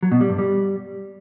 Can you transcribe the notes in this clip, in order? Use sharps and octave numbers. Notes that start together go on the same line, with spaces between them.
F#3
B2
G3
G2
G3